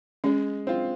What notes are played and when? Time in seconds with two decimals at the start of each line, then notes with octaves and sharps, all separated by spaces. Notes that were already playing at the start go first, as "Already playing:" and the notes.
0.24 G#3 C#4
0.67 C4 F4